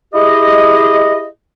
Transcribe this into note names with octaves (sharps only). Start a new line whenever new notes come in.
E4 G4 G#4 D#5